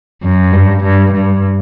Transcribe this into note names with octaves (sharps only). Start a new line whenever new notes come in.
F#2
G2
G2
G2